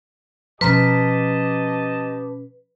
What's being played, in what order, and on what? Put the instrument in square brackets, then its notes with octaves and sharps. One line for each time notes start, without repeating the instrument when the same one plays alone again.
[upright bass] B2 C#4 [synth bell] F3 A#5 [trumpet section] G4 D#5 A5 [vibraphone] B4